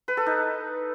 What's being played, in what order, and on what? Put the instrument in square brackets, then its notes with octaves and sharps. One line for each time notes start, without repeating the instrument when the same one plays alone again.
[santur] B4
A4
D#4